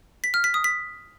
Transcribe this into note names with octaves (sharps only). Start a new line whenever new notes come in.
B6
F6
B6
D#6
B6